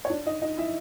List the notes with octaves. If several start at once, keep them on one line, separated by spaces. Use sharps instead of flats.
C#5
D4 D5
D#4 D#5
D#4 D#5
E4 E5